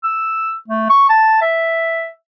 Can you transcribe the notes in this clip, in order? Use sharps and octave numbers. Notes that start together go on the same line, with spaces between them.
E6
A3
C#6
A5
E5